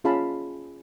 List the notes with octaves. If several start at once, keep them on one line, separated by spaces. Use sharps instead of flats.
C#4 F4 G#4 F5 A5 B5